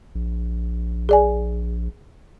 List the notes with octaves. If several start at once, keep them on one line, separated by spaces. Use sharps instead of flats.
A#1
G#4 D5 G#5